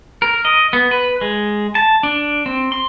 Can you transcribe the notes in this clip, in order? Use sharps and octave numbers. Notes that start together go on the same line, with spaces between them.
A#4
D#5
B3
B4
G#3
A5
D4
C4
C6